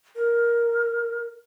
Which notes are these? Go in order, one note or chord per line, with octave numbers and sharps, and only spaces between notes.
A#4